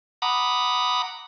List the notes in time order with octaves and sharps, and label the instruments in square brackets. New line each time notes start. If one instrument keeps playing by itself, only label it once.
[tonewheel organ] F#5 A#5 B5 D6 D#6